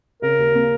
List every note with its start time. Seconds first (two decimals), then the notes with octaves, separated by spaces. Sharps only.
0.22 C#3 A#4
0.39 D#2
0.55 A#3